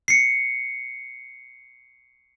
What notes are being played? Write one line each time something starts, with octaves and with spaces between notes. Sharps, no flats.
C7 C#7